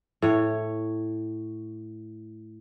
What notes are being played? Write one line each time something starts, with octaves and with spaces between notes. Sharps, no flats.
A2 C#5